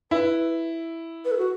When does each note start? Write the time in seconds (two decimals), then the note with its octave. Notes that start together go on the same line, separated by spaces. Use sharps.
0.11 E4 B4
1.25 B4
1.31 A4
1.38 F#4